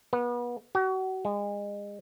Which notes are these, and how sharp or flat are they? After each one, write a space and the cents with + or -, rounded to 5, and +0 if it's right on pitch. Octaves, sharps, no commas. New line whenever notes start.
B3 -35
F#4 +35
G#3 -30